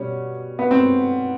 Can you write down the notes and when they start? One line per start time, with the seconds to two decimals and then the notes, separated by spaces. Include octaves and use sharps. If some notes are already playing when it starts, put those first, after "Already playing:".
Already playing: B2 G3 C#4
0.59 B3
0.71 C4